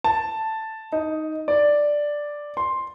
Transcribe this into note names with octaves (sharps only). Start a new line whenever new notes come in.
A5
D#4
D5
C6